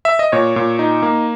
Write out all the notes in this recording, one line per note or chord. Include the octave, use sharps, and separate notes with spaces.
E5
D#5
A#2 C#5
A#2
D#4
A#3